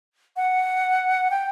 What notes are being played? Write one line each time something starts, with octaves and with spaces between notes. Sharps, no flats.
F#5
G5